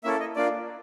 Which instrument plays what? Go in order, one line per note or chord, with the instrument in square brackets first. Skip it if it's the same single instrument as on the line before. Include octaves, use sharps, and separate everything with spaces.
[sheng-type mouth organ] A#3 C#4 E4 A4 E5
D#5
A#3 D4 F4 D5